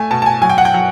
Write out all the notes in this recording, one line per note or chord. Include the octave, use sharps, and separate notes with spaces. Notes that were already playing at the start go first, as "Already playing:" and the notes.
Already playing: A3 G#5
B2 A5
A5
G#5
F#3 G#5
G5
F#5
G5
F#3